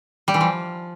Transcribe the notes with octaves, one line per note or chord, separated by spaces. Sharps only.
G3
E3
F3